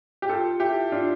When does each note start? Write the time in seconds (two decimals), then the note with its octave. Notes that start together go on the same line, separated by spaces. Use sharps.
0.22 G4
0.29 F4 A4
0.60 E4 G4
0.92 D4 F4